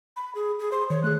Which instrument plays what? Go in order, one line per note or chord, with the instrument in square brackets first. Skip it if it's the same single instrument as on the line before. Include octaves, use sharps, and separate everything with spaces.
[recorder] B5
G#4
G#4
[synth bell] C5 [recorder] C6
[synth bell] D#3 [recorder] C#5
[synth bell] A3 G#4 [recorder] F#6